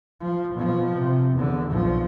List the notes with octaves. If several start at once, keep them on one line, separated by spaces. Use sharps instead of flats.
F3
B2 F3
C3
E2 D3
B1 F3